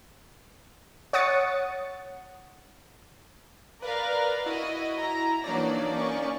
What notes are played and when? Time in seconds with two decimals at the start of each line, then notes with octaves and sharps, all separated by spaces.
1.13 C#5 F#5 D#6 A6 C#7
3.82 A#4 B4 D5 F5
4.46 E4 F#4 D#5
4.99 A#5
5.44 E3 F#3 A#3 D4 D#4 D5
5.93 C#4 C#6